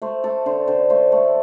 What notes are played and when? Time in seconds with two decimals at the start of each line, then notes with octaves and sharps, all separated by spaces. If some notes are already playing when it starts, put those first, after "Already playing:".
0.02 A3 C5
0.24 A3 A4
0.46 D3 C5
0.67 D3 C5
0.90 A3 C5
1.12 A3